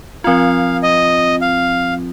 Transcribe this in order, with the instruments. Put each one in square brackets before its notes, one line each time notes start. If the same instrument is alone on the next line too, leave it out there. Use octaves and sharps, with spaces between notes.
[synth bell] F3 C4 F4 [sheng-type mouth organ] F5
[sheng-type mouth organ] D#5
F5